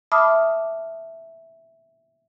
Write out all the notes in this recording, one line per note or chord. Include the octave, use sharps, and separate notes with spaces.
E5 A5 B5 D6 D#6 F6